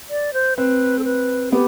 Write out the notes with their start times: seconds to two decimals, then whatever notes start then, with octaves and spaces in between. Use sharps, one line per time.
0.10 D5
0.33 C5
0.57 C4 B4
0.99 A4
1.04 B4
1.52 B3 G4